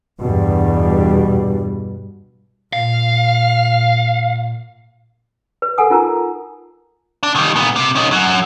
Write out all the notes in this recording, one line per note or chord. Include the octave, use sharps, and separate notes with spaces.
E2 G2 B2 G3
A#2 F5
B4
A4 A#4 F#5 G#5 D#6
D#4 F4 A#4 A#5
D4
D#3 G3
A#2 B3
C3
C#4 D#4
F#2 F#3